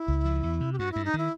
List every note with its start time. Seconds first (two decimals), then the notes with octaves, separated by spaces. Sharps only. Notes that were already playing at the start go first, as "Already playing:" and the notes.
Already playing: E4
0.08 C#2
0.25 F3
0.43 E2
0.61 C3
0.73 G4
0.78 G2 F#4
0.92 G2 E4
1.05 D#4
1.14 D#3 E4